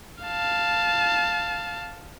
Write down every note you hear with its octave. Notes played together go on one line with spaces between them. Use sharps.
F5 A5